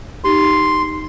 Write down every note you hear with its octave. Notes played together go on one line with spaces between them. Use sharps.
D#4 G4 C6